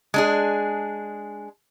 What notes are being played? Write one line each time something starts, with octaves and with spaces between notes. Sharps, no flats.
G#3 D4 G#4